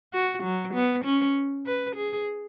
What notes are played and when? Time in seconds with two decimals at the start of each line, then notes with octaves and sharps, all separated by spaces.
0.13 F#4
0.44 F#3
0.74 B3
1.05 C#4
1.66 B4
1.96 G#4